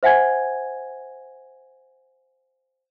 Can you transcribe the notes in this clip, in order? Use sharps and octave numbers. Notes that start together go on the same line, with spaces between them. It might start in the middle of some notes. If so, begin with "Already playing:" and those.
C5 E5 F#5 G#5 G#6